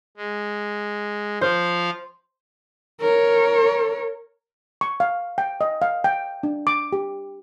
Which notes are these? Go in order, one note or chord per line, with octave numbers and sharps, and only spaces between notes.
G#3
F3 C5 F5
A#4 C#5
C#6
F5
G5
D#5
F5
G5
D4
D6
G4